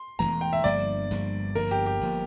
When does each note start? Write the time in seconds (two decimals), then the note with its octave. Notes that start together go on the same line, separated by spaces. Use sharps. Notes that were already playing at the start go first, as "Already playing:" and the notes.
Already playing: C6
0.19 E1 E2 E3 A3 A#5
0.41 G5
0.53 E5
0.64 G1 G2 F3 A#3 D5
1.10 G1 G2 F3 A#3
1.55 G1 G2 F3 A#3 A#4
1.71 G4
1.86 G4
2.01 G1 F3 A#3